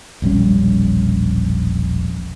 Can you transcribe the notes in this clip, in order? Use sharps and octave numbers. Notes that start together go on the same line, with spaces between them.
E1 A#1 G3 C#4